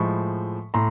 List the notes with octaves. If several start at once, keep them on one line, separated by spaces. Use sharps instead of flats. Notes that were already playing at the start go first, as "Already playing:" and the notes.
Already playing: A2 F3 G#3 B5 C#6
A2 A#5 C6